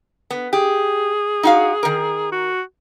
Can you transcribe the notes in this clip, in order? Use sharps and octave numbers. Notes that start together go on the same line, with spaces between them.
B3
G4 G#4
D#4 F#4 F5
D#3 A#4
F#4